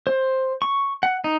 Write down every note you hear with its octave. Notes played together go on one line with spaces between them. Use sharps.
C5
C#6
F#5
D#4